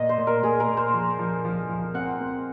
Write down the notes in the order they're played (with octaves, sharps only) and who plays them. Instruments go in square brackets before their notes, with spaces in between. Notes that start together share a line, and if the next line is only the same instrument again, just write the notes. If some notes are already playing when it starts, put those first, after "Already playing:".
Already playing: [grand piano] A#2 [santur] D#5
[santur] C5
[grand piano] A#2
[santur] A#4
[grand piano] A#2 [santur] G#4
[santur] A#4
[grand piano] A#2
[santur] C5
[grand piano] F3
F3
F3
F3
[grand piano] C4 [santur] F#5
[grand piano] C4